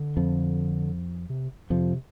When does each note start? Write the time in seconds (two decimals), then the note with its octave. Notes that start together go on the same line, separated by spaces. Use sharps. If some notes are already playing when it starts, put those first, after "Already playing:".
Already playing: D3
0.17 F2 F3
1.30 C3
1.70 F2 C3 F3